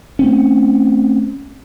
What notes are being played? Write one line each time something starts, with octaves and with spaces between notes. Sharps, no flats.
A3 C4 C#4